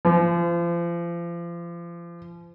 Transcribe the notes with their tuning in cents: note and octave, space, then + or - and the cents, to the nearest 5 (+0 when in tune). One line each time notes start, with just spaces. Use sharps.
F3 -35